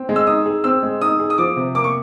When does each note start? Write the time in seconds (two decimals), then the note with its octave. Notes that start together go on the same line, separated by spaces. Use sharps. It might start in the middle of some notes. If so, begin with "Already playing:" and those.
Already playing: C4
0.09 G#3
0.16 E6
0.27 D#4 D#6
0.46 G#4
0.64 C4 E6
0.83 G#3
1.01 D#4 D#6
1.20 G#4
1.30 D#6
1.38 F3 D6
1.57 C3
1.75 A#3 D6
1.84 C#6